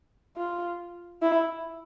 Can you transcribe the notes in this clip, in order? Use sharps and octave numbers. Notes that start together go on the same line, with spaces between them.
F4
E4